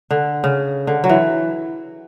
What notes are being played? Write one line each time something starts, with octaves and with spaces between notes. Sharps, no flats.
D3
C#3
D3
F#3
E3